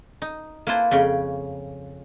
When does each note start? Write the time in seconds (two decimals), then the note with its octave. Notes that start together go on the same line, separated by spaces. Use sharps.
0.22 D#4
0.67 A#3 E4 B4 C5 A5
0.91 F2 C#3 C#4 G5 B5